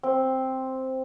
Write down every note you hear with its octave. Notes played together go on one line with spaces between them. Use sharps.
C4